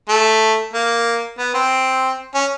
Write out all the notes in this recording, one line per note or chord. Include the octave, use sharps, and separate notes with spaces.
A3
A#3
B3
C4
C#4